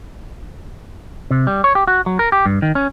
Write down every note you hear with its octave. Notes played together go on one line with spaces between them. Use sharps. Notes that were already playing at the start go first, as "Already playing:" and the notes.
C3
G3
C#5
G4
F#4
F#3
A#4
G4
G2
D#3
C#4